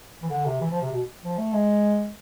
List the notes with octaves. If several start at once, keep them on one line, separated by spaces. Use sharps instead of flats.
E3
D3
C3
E3
F3
C3
B2
F3
A3
G#3